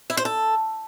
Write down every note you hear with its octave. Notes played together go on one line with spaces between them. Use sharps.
E4
C5
A4